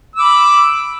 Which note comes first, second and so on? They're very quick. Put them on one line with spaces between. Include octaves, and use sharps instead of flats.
E6 D6 B5